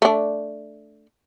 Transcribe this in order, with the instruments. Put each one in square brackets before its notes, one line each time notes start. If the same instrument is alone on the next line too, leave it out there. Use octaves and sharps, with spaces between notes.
[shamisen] A3 D4